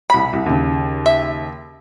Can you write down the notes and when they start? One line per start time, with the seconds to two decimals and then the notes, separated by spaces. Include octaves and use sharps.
0.10 C2 B5 B6
0.33 C2
0.46 D#2 C#3
1.06 E5